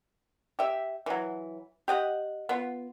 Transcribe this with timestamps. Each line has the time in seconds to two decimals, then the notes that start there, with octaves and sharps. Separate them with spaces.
0.59 G4 E5
1.06 E3 F#3
1.88 G4 D#5 F#5
2.49 B3 F4